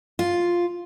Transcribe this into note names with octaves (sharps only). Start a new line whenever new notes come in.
F4